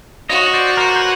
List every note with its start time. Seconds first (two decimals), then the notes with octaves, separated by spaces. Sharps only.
0.29 F#4 C#5 D#5
0.53 C5 D5
0.77 A#4 C5
0.96 C5
1.00 B4 C#5